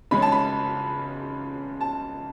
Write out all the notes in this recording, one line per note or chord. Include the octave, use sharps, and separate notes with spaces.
C#2 C#3 G#3 C#4 B5
A5
B5
A5